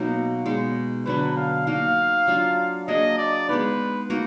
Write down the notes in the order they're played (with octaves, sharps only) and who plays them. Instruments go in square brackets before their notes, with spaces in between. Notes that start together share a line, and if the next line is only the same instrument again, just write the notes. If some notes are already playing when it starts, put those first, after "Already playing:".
Already playing: [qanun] B2 F#3 A#3 D#4
B2 G#3 D#4
[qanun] D3 F#3 D4 [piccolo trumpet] B4
[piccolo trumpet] F5
[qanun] A#3 D#4 F#4 [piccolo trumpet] F5
[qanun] F#3 D4 F4
[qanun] F#3 A#3 D4 G#4 [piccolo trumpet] D#5
[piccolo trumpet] D5
[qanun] G#3 B3 D#4 [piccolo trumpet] B4
[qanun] A#3 D#4 F#4